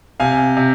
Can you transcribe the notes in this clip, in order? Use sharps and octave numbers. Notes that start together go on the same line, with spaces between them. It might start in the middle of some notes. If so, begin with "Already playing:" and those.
C3 F5 G#5
C3